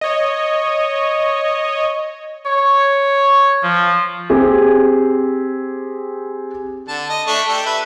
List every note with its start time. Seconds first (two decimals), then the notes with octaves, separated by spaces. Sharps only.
0.01 C#5 D#5
2.46 C#5
3.64 F3
4.30 C4 G4 G#4
6.88 D3 A5
7.10 D#5
7.27 A3 D4 C#6
7.49 D4 G4 A4
7.66 B4 E5